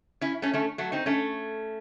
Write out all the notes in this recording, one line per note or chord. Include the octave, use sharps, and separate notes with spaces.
C#4 E4
A3 C#4
A3 C#4
F#3 A3
C4 D#4
A3 C#4